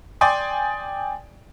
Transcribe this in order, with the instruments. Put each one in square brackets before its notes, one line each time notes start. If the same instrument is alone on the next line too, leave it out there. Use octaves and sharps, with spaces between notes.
[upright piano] D5 G5 G#5 C6 D#6